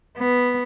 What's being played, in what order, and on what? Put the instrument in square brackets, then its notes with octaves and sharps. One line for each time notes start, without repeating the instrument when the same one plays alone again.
[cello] B3